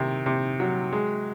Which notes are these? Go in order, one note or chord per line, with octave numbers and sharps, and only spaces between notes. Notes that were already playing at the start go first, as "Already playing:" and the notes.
Already playing: C3 D#3
C3
F#3
G#3